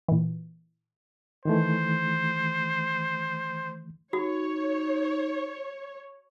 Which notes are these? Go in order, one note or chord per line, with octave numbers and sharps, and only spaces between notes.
A#2 E3
D#3 E3 A3 C5
D#4 F#4 C#5